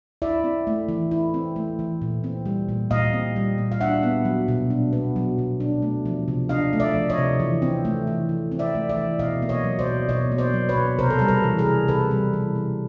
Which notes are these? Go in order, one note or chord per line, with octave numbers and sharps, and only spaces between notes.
E4 D5 E5
C4
A3
E3
E4
C4
A3
E3
A#2
C4
G3
A#2
A#2 D#5 F5
C4
G3
A#2
F5
D4 E5 F#5
B3
F#3
B2
D4
B3
F#3
B2
D4
A3
F3
C3
D4 D#5 F5
A3
D5 E5
F3
C#5 D#5
C3
E3
C4
A3
E3
E3
C4
D5 E5
A3
D5 E5
E3
B2 D#5 F5
A#3
C#5 D#5
F#3
C5 D5
B2
B2 C#5 D#5
A#3
C5 D5
F#3
B4 C#5
B2
C3 A#4 C5
A4
G3 A#4
A4 B4
E3
G#4 A#4
C3
C3 A4 B4
G3
E3
C3